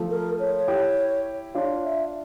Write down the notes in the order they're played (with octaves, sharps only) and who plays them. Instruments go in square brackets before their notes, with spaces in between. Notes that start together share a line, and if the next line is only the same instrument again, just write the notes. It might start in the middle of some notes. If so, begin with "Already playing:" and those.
Already playing: [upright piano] F3 A3
[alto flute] A#4
C#5
[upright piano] E4 G4
[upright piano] D4 F4 [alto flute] C#5
[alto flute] E5